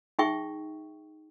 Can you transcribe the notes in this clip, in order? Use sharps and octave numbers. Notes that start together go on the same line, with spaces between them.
D#4 G#4 E5 G5 C#6